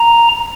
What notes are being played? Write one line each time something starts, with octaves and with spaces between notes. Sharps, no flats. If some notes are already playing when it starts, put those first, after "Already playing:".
Already playing: A#5